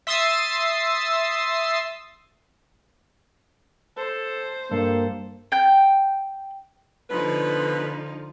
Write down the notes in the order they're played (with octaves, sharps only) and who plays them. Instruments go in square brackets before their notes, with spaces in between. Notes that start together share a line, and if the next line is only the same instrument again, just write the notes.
[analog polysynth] E5 C6 D#6 E6 A6 C7
[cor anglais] A4 [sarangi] C5
[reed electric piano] G2 [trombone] A#3 [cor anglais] A4
[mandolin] G5 G6
[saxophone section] B2 B4 [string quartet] D3 F3 D#4